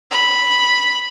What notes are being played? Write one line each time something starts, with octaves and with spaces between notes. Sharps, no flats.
B5